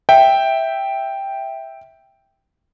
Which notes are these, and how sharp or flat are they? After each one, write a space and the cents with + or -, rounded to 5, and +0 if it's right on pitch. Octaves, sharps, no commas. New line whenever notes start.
E5 -5 G5 +0